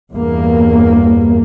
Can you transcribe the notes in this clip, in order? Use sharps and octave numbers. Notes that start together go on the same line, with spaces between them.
E2 G2 A#3